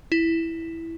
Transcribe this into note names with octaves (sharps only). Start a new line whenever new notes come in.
E4